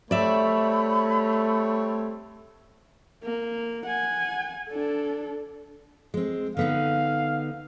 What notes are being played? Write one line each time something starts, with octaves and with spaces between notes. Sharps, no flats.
G3 A3 C4 C#5 D5 E5 B5
A#3
F#5 G#5
D4 A4
G#3 C4
D3 B3 D#4 F5